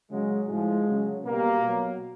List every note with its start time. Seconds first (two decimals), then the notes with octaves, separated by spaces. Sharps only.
0.09 C#3 F#3 G#3
0.47 A2 F3 G#3
0.86 C#3 F#3
1.24 B2 G3 A#3
1.63 B2 F#3